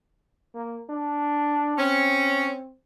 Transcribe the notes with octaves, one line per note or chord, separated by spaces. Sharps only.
A#3
D4
C4 C#4